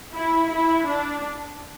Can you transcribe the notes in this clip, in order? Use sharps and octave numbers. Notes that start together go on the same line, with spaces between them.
E4
E4
D4